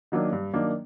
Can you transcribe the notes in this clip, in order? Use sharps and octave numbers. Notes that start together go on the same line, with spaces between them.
D#3 F#3 A#3 D4
G2
D#3 F#3 A#3 D4